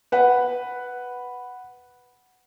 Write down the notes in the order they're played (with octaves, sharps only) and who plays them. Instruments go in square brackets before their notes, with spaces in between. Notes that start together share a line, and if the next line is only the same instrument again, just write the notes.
[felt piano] B4 F#5